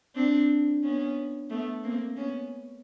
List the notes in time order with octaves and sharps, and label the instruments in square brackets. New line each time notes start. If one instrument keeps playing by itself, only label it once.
[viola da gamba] C4 D4
B3 C#4
A3 B3
A#3 C4
B3 C#4